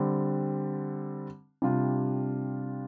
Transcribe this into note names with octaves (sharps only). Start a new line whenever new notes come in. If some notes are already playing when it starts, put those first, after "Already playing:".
Already playing: D3 G3 C4
C3 G3 D4 F4